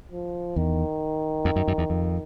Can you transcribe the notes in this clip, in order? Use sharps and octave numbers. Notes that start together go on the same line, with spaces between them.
F3
E2 D#3
F2
F#2
F#2
E2
F2